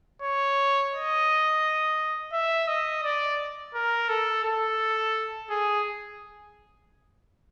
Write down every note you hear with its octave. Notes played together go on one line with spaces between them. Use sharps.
C#5
D#5
E5
D#5
D5
A#4
A4
A4
G#4